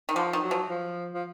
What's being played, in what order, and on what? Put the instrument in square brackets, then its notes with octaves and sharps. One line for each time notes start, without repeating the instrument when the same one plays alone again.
[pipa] D#3
[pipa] D3 [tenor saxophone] F3
[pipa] D#3
[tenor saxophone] F#3
[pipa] F3
[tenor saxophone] F3
F3